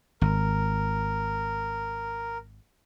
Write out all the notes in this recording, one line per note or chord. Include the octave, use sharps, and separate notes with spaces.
G#1 A#4